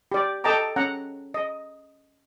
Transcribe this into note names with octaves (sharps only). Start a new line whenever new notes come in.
G4 D5
A4 D#5 G5 A5 A#5 D6
C#4 F#5 A#5
D#5